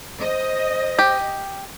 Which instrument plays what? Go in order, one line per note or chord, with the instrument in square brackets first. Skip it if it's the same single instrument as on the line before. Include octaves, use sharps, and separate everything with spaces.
[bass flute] C5 [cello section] D#5
[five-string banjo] G4